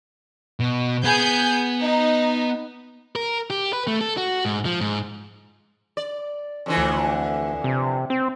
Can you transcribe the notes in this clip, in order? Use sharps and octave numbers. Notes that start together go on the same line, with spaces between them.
B2
B3 G#4 G#5 G6
D#4
A#4
G4
B4
A3
A4
F#4
G#2
F3
G#2
D5
F2 D3 E3
D2
C3
C4